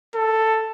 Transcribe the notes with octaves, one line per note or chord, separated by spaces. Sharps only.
A4